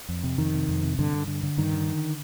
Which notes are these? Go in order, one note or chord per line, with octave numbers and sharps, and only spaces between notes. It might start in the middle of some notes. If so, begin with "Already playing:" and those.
F2
C3
F2 D#3
C3
F2
C3
G2 D3
G2
D3
D3
G2 D#3
D3
D3